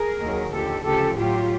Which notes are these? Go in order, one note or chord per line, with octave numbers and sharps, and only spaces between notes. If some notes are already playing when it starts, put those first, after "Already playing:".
Already playing: G#4 A#4
D#2 D#3 F#3
D#2 D3 F3 G4 A4
D2 C#3 F3 G4 A4
A2 F#3 F4 G4